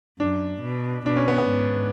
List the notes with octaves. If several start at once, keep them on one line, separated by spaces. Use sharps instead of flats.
F#2 D4
B2
B2 D4
C#4
B3
B3
G#2